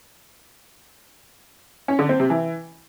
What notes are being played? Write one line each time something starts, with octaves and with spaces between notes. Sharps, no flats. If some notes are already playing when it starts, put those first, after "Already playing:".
C#4
D3
C4
C3
E3